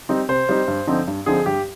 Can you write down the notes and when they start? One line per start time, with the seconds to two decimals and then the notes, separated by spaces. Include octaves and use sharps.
0.09 G3 C4 D#4
0.29 C3 C5
0.49 G3 C4 D#4
0.68 G2
0.87 D3 F3 C4 D#4
1.08 G2
1.26 D3 F3 C4 D#4 G#4
1.46 G2 G4